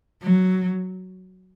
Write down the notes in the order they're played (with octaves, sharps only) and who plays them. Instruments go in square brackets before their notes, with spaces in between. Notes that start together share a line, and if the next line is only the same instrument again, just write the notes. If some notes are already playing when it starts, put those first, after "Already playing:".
[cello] F#3